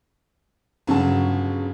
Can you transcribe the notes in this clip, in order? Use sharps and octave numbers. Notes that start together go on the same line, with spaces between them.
G1 C#3 F#3 A5